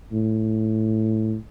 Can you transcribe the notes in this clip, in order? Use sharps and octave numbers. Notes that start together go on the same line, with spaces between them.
A2